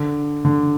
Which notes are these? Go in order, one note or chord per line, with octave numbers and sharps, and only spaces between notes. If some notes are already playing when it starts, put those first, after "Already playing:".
Already playing: D3
D3